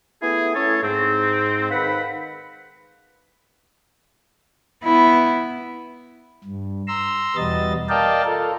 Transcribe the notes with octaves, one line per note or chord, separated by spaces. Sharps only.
A3 B3 E4 G#4
A3 C#4 E4 G#4 A4 C#5
G#2 C4
D#3 B4 F5 F#5 B5
B3 E4
G2
A#5 C6 E6
E2 B2 G3 B3 D#5 A6
A#4 D5 D#5 F5 G5 A5
F4 A4 A#4